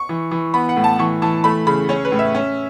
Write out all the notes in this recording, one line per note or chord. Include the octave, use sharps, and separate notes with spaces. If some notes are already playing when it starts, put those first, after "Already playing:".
Already playing: C#6
E3
E3
B3 B5
F#5
A2
A5
E3 C#6
E3 A5
A3 B5
C#3 B5
C#4 C#5
B4
A2
E5
C#4